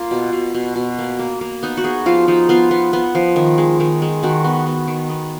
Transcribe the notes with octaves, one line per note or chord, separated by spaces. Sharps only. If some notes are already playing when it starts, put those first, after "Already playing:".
Already playing: A#3 F4
B2
B2
B2
B2
A#3
A#3
A#3
B3 D#4
F#4
B3 G#4
F3 F4
F3 D#4
B3 F4
B3
B3
F3
D#3
G#3
D#3
G#3
D#3 F#4
B3
B3
D#3
B3